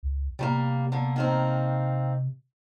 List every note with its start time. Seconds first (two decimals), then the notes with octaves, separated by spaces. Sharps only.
0.03 C#2
0.39 C3 G3 A3 A#3
0.92 D3 A#3
1.16 D#3 A#3 C4